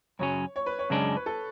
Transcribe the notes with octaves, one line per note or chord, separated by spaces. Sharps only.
F#2 C#3 F#3 C#4 C#5
C#5
B4
C#5
F#2 C#3 G#3 D4
B4
A4